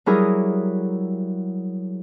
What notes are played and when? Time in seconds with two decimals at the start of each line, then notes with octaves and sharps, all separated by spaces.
0.06 F#3 G3 E4 G#4 A#4 D#6